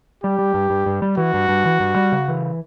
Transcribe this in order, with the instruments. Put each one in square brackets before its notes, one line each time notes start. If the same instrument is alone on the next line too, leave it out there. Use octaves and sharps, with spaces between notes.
[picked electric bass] G3 [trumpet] G4
[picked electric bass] G3
G2
G2
G2
G3
[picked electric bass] E3 [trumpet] F#4
[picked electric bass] G2
G2
E3
G2
G3
C#3
E3